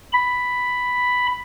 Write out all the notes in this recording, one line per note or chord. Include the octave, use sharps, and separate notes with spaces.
B5